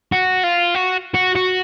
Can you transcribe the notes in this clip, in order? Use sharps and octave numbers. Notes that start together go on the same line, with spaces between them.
F#4
F4
F#4
F#4
F#4